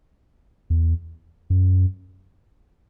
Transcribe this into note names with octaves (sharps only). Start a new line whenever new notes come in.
E2
F#2